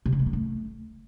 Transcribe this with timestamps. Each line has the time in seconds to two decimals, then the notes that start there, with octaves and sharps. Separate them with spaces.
0.06 C3
0.12 A#3
0.19 G#3
0.26 A#3
0.33 A3